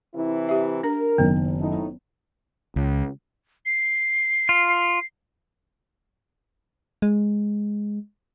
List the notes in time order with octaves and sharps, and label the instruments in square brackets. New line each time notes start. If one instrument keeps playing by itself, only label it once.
[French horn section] C3 E3 E4
[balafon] G4 E5
[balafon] D4 A#5 [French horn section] A#4
[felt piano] F#1 D#3 [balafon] B3
[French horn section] A2 D#4
[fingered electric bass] C#2
[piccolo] C7
[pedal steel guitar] F4
[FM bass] G#3